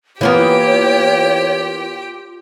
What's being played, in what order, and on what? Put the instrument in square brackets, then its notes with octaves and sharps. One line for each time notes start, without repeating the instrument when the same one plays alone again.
[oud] E3 A#3 B3 [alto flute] F4 [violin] G4 G5 [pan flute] C#5